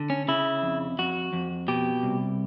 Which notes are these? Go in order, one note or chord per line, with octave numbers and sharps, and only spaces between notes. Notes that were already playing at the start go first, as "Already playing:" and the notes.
Already playing: D3
C#4
C#3 E4
F2
F2 F#4
F2
B2 G4
C2